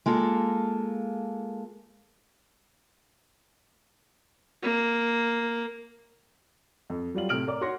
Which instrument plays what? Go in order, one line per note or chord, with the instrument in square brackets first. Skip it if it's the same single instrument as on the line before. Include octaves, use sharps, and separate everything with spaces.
[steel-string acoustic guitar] G#3 A#3 F4 A4
[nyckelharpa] A#3
[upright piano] F2
F#3 G3 F4 F#7
A2 C3 F6 D7 F#7
A#4 D5 D6
F#4 C#5 F#5 C6 A#6